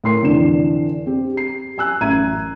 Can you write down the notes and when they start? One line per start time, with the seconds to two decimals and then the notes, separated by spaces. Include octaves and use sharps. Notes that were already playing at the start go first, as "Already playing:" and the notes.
0.04 A2 A#4 C6 C7
0.23 F1 D3 E3 D4 E7
1.06 C4 G4
1.34 G4 C7
1.78 G#5 E6 F#6
2.01 A1 F#2 E5 A#5 G#6 D#7